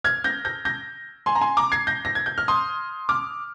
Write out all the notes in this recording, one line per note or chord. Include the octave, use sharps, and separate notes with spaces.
F6 G#6
G6 A#6
G6 A#6
G6 A#6
G#5 C6
A#5
G#5 C6
A#5 D6
G#6 C7
G6 A#6
A#6
G#6
G6
F6
C6 D#6
D6 F6